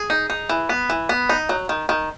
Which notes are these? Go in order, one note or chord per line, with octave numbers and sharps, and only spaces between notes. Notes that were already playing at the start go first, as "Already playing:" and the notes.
Already playing: G#4
D#4
D#4
E3
B3
E3
B3
D#4
F#3
D#3
D#3